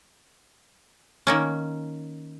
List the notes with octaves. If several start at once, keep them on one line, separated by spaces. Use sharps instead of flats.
D#3 A#3 C#4